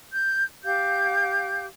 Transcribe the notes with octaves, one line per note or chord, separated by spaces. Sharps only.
G6
G4 F5 G6